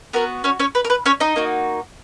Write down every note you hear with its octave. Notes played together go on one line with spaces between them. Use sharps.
B3 F#4 A#4
C#4 C#5
C#4 C#5
B4
A#4
B4
C#4 C#5
D#4 D#5
A#3 D#4 F#4